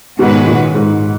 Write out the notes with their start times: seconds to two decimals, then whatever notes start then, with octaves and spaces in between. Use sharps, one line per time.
0.18 G#2 B2 D#3 G#3 C#4 F#4 B4
0.47 A#2
0.75 G#2